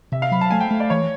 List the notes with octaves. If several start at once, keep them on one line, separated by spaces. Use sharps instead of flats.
C3 E5
F5
F#3 B5
A5
A3 G#5
G5
A3
D5
E3 C#5